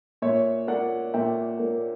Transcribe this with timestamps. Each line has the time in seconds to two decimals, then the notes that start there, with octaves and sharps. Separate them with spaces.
0.22 A#2 C#5 E5
0.67 A#3 D5 F#5
1.14 A#2 E5 G5
1.59 A#3